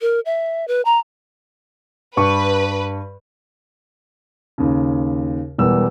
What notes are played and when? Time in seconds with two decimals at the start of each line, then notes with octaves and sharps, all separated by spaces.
0.01 A#4
0.26 E5
0.68 B4
0.85 A#5
2.17 G2 B4 C#6
4.58 D#2 C#3
5.58 E1 E2 G3 B3 A#4 E6